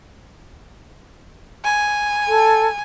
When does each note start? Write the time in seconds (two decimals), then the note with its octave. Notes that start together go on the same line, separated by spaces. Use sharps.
1.65 G#5
2.28 A4